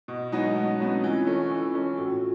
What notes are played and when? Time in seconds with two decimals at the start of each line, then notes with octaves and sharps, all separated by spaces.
0.08 B2
0.32 F#3 G#3 B3 D#4
0.56 B2 A3
0.68 C#4
0.80 F#3 B3 C4 D#4
0.92 C#4
1.03 E3 F4
1.27 A3 C#4
1.51 E3
1.75 A3 C#4
1.98 A2 F#4
2.10 F4